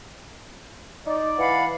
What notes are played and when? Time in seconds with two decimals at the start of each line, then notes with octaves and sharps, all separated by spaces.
1.06 D#4 D5
1.38 E3 F5 F#5 B5